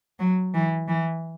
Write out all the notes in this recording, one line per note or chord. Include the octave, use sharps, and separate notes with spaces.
F#3
E3
E3